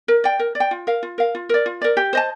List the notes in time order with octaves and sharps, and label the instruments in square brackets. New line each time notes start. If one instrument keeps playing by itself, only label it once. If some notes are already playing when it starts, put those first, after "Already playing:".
[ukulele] A#4
D5 G5
A#4
D5
G5
F4
A#4 F5
F4
A#4 F5
F4
A#4 D5
F4
A#4 D5
G4
C5 D#5 A5